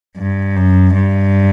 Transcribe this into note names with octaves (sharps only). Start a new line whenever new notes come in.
G2
F#2
G2